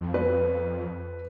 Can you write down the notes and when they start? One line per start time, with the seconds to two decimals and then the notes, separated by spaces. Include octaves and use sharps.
0.01 F2
0.14 B4